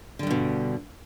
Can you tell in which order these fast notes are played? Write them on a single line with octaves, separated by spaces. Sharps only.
D3 G3 G2 B2